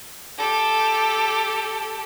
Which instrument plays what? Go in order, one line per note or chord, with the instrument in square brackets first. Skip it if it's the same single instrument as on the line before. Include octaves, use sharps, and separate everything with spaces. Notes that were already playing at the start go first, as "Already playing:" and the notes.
[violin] G4 A4